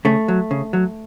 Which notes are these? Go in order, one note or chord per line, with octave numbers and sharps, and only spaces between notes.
C#3 A3
F#3
C#3
F#3